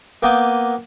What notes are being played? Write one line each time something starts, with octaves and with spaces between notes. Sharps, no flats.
A#3 B3 G5 D6 D#6